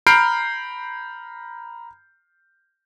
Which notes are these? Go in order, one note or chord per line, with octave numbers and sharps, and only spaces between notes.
A#5 B5 F6 G6 C7 D7